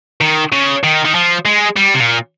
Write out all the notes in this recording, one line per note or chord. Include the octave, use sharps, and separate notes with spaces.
D#3
C#3
D#3
D#3
F3
G#3
G3
C3
A#2